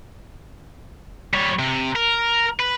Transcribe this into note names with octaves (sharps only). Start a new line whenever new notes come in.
G3 C#5
C3
A#4
B4